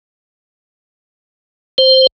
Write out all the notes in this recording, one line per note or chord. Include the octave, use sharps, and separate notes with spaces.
C5